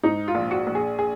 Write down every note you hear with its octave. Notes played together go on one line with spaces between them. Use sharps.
G#2 D#4
F4
A#1
F#4
A#1
G#4
G#4